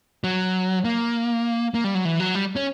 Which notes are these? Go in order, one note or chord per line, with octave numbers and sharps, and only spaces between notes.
F#3
A#3
A#3
G3
F#3
E3
F#3
G3
C#4